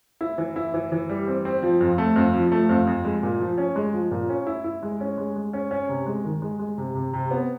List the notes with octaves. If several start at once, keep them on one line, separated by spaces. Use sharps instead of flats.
E4
E3
E4
E3
E3
G3
C4
C4
F3
F2
A3
F2
F3
A3
F2
F2
G#3
A#2
F3
C#4
G#3
F3
A#2
C#4
E4
E4
G#3
C#4
G#3
G#3
C#4
C#4
C3
G#3
D#3
G#3
G#3
C3
C3
C3
B3